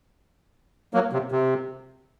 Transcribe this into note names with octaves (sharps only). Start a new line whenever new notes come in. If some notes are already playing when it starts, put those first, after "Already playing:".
F#3 A#3
C3
C3